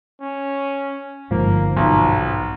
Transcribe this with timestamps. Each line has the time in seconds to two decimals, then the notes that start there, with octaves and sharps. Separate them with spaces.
0.21 C#4
1.31 G1 G#2 F3 A#3
1.76 B1 B3